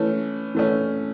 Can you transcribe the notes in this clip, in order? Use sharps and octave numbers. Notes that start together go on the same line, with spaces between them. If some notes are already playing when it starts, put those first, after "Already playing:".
Already playing: E3 A3 C#4
E3 A3 C#4